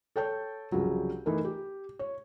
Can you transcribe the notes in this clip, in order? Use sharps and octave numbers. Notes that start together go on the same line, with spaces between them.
A4 C#5 G5 A5 G6
C2 C#3 F3 F#3
E3 A3 D#4 A#4
G4
C#5